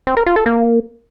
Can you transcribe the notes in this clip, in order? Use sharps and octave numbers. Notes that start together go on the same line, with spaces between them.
C4
A#4
F4
A4
A#3